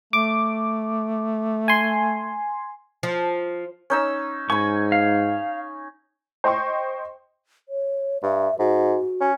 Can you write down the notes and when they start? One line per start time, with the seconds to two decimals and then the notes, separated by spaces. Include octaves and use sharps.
0.13 A3 D6
1.68 G#5 C6
3.03 F3
3.90 C#4 D#4 E6
4.50 G#2 G#5 B5 C#6
4.92 F5
6.44 C5 D#5 G5 C6 C#6
7.69 C#5
8.23 G2 E5
8.59 G#2 F#4
9.21 C#4